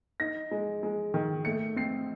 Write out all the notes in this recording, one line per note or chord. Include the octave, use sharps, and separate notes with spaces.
D#4 A#6
G#3
G#3
D#3
A3 C#7
C4 C7